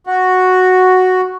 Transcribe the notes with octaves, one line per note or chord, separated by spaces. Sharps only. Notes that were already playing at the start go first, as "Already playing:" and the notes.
F#4